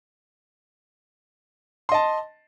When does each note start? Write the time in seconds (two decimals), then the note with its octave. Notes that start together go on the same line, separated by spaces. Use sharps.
1.89 C6
1.92 D#5
1.94 A5